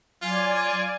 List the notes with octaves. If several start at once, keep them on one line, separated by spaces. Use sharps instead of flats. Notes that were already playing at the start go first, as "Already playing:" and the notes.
F#3 F4 D5 G#5